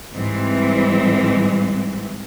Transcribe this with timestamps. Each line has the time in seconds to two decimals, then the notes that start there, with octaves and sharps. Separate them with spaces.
0.14 G#2 E3 G3 C4